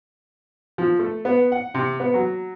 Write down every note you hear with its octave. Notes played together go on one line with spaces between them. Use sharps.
F3
A3
B3
F#5
C3
B3
F#3